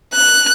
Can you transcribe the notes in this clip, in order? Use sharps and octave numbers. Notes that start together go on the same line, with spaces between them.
F#6